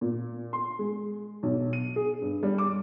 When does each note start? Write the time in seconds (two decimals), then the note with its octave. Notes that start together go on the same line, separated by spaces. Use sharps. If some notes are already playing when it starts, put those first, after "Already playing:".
0.01 A#2
0.53 C6
0.79 G#3
1.43 B1
1.73 D#7
1.96 G#4
2.21 G2
2.43 G3
2.58 D6